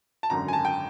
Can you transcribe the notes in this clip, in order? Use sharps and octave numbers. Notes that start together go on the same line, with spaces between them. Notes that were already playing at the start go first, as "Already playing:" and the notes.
A5
G#1 F#2 D3 A#5
G#5
A5
G5